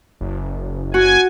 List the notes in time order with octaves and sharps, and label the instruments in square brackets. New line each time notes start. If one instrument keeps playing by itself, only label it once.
[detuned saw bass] F#1
[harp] F#4 [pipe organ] G#5